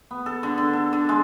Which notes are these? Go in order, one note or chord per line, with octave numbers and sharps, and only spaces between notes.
B3
A4
D3
D3
A4
D3
G#3